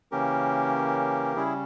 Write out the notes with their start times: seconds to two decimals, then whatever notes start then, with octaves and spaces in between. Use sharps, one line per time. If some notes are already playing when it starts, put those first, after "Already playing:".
0.12 C#3 E3 A#3 C#4 G4 A#4
1.36 C#3 G3 C#4 E4 G#4